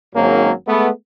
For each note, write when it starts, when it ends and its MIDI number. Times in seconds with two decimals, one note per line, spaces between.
0.14 0.51 32
0.14 0.51 44
0.14 0.51 54
0.14 0.51 58
0.14 0.51 61
0.68 0.90 56
0.68 0.90 57
0.68 0.90 59